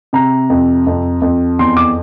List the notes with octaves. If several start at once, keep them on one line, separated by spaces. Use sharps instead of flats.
C3 A#5
F2
F2
F2
E2 C6
D6